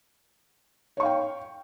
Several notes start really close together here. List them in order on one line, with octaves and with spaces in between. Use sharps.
C#5 C#6 F5 G5